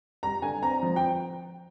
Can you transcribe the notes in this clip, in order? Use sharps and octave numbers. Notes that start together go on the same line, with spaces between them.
G3 A#5
D3 G#5
C4 A#5
F3
G5